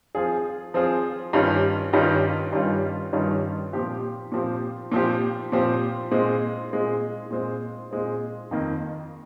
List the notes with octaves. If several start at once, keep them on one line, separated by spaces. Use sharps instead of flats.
F3 C4 F4 G#4
F3 C4 F4 G#4
G2 D#3 G3 C#4 F4
G2 D#3 G3 C#4 F4
G2 D#3 G3 C#4 F4
G2 D#3 G3 C#4 F4
A#2 F3 C4 G4
A#2 F3 C4 G4
A#2 F3 C4 G4
A#2 F3 C4 G4
A#2 G#3 C4
A#2 G#3 C4
A#2 G#3 C4
A#2 G#3 C4
F2 D#3 A#3